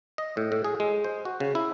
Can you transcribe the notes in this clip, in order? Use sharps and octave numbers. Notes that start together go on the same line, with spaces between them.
D#5
A2
A2
G#4
G#3
C5
F#4
C#3
E4